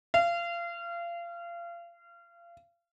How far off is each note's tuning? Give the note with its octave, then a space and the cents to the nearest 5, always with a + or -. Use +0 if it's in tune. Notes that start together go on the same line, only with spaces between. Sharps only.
F5 -30